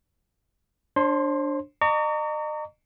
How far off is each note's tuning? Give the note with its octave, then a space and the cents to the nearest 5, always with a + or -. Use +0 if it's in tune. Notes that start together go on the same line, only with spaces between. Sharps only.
D4 +0 C5 +40 C6 +0
D#5 -40 A#5 -30 C#6 +35